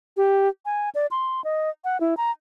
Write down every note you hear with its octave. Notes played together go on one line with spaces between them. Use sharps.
G4
G#5
D5
C6
D#5
F#5
E4
A#5